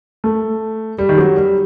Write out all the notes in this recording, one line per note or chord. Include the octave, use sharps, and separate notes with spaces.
A3
G3
D#3
F#3
G3